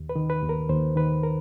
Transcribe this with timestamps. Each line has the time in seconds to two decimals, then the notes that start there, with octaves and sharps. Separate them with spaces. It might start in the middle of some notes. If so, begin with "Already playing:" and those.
Already playing: D#2
0.09 B4
0.16 D#3
0.30 B4
0.43 D#2
0.49 A#4
0.69 D#2 C5
0.96 D#3 B4
1.23 A#4